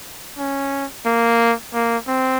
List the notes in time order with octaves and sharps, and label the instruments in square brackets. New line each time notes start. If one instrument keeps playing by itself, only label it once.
[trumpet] C#4
A#3
A#3
C4